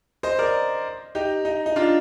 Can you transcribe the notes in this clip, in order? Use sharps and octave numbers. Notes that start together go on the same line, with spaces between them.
C5 D#5
A#4 D5
D#4 G4
D#4
D#4
D4 F4